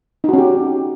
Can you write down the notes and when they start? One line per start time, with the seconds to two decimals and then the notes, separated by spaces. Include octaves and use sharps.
0.24 D#4
0.29 F#4
0.33 C#4
0.38 G4